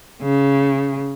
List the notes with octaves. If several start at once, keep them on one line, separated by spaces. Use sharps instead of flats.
C#3